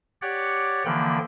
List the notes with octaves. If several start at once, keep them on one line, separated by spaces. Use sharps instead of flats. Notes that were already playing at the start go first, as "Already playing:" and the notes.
G4 C#5 D5 F#5
D3 E3 F3 A#3 G5 F#6